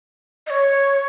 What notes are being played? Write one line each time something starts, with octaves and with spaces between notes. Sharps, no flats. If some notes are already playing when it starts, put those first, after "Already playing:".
D#5
C#5